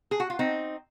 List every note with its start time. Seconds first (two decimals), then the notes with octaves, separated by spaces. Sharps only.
0.11 G#4
0.20 F#4
0.30 F4
0.39 C4 D#4